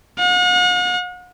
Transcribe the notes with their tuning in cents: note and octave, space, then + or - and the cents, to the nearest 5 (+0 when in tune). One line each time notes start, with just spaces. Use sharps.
F#5 -45